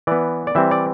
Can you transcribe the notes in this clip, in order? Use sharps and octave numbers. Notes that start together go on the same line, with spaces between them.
E3 B3 D5
D5
E3 G3 C4 E5
D5